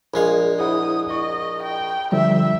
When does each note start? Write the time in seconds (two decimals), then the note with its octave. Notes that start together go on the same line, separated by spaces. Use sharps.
0.14 A#1 G#3 F5
0.60 E4 C5 F#5 D#6
1.10 D#5 C#6
1.63 G5
2.12 D3 F3 G3 E5